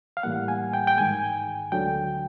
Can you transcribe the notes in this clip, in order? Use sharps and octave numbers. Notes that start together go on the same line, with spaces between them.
F5
A2 E3 G3 A#3 F#5
G#5
G5
G5
G#2 D#3 G#3 G#5
D2 D3 F#3 G5